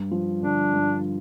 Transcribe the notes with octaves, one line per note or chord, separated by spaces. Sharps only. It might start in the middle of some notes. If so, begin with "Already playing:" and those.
Already playing: G2
F3
D3 D4
G2